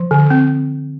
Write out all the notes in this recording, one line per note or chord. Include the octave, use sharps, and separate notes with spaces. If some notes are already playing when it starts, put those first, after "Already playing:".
Already playing: F3
D3
C4